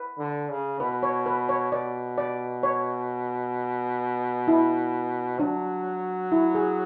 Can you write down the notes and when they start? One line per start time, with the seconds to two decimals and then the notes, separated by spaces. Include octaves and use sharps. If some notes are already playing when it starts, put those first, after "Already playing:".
Already playing: B4
0.18 D3
0.49 C#3
0.80 B2 B4
1.03 C#5
1.26 B4
1.49 C#5
1.72 B2 D5
2.18 D5
2.63 C#5
4.48 E4
5.40 F#3 D4
6.32 E4
6.55 G#4